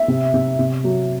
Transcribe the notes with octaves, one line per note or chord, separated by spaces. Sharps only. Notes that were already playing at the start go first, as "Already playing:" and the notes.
Already playing: E5
C3
C3
C3
F#3